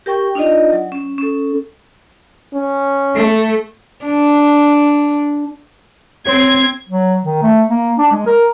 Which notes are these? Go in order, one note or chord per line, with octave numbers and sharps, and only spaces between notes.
G4 A#4 G5 C#6
D4 D#4 F4 D5 D#5
F#3
C#4
C#4 A4
C#4
A3
D4
C4 C#5 C6 G#6
F#3
D#3
A3
A#3
D4
G#3
A#4